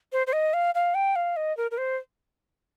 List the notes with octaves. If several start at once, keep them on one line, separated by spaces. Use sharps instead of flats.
C5
C5
D#5
F5
F5
G5
F5
D#5
A#4
A#4
C5